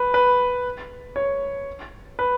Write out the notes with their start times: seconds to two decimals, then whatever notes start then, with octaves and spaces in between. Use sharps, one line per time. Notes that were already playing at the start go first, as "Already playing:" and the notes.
Already playing: B4
0.14 B4
1.16 C#5
2.19 B4